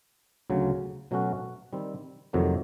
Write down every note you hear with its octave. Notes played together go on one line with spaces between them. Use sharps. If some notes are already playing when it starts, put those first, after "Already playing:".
D2 C#3 F#3
B2 F#3 A3 C#4 F#4
D#3 G3 C4
F2 C3 D#3 F#3 A3